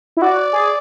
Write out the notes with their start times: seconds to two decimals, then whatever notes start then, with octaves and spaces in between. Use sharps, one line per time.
0.17 E4
0.22 F#4 D5
0.53 G#4